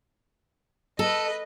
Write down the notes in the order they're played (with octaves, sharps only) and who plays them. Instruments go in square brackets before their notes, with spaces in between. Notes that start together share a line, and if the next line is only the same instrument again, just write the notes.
[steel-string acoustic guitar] A4 [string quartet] B4 D#5